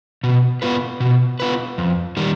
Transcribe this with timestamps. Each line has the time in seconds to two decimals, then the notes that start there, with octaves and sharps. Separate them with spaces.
0.24 B2
0.62 B3 F4 B4
1.00 B2
1.40 B3 F4 B4
1.78 F2
2.17 D#3 G3